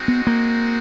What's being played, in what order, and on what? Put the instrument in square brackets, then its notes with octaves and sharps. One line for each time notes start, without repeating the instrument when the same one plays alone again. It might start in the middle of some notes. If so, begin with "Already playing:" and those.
Already playing: [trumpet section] G#3 C4 D#4 F#4
[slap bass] B3
A#3